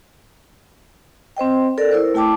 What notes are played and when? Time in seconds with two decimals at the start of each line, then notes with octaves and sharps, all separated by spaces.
1.37 C4 C5 D#5 G5
1.78 A4 A#4 D5
1.91 E4 A#4 C5
2.14 A3 E4 G5 A5 D6